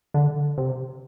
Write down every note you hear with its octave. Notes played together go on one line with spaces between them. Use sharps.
D3
C3